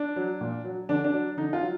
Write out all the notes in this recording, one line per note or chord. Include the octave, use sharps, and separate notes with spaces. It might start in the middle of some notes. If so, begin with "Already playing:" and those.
Already playing: D4
F#3
A#2
F#3
D3 D4
D4
F#3
D3 D#4
F4
F#3